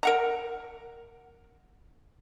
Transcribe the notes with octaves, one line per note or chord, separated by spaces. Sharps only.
A#4 F#5 A#5